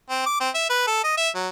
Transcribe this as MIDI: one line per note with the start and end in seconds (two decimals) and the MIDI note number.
0.10 0.25 60
0.26 0.36 86
0.40 0.49 60
0.55 0.65 76
0.69 0.86 71
0.87 1.04 69
1.04 1.15 75
1.17 1.29 76
1.35 1.48 54